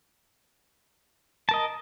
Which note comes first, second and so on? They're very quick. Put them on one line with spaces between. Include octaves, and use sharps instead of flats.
A5 A#4 D#5